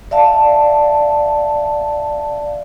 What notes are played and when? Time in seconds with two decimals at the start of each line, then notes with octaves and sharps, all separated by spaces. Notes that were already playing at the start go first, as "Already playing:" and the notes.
0.11 D5 E5 F5 A5